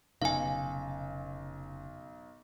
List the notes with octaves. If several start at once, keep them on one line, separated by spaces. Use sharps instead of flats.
F1 B1 C#3 F5 G#5